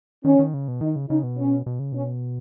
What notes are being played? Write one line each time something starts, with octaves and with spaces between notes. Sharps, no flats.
D#3 C#4
D#3
C#3
B2
D#3 D#4
C#3
C#3 D#4
B2
C#4
B2
C#3
B2 C#4